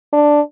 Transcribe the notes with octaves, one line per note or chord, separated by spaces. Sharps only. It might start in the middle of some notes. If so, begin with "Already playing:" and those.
D4